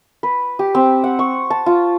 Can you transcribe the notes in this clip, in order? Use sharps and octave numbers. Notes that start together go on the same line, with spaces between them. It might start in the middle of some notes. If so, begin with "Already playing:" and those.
B4
G4
C4
F#5
C#6
A5
F4